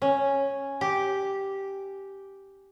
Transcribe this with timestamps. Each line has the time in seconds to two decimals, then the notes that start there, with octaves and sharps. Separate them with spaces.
0.02 C#4
0.81 G4